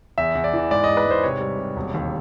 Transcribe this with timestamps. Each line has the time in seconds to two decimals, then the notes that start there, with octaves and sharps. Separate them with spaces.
0.18 E2 E5
0.35 E2
0.44 D5
0.53 E3
0.71 G#2 D5
0.84 G#2 D#5
0.97 B4
1.06 G#2 C5
1.23 C3 C#5
1.41 G3
1.59 C3
1.76 E1
1.94 D#2